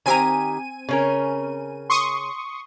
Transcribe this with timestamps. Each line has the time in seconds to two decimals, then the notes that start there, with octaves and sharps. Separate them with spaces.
0.06 D#3 C4 G4 G#5 A#5 D#7
0.89 C#3 C#4 A#4
1.90 C6 C#6 D#6